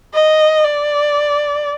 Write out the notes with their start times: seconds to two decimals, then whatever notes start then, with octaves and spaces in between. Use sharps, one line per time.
0.14 D#5
0.64 D5